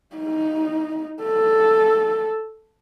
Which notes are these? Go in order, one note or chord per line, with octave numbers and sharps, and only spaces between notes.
D#4
A4